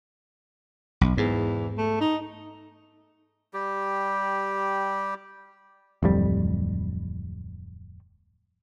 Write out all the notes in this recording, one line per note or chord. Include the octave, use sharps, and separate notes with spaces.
B1
E2 G#2
A3
D#4
G3 G4
D1 F2 G3